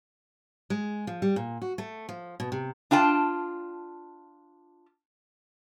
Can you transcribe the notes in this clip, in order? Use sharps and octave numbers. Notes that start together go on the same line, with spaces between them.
G#3
F3
G3
A#2
F#4
A3
F3
B2
C3
D4 F4 G5 A5